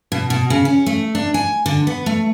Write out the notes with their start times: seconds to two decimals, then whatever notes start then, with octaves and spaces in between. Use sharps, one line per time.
0.12 B2
0.30 B2
0.50 C#3
0.65 C#4
0.86 A3
1.15 D4
1.34 G#5
1.66 D3
1.87 B3
2.06 A3